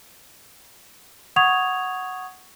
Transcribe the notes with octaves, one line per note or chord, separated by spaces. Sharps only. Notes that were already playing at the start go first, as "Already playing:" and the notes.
F#5 C#6 D#6 G#6 F7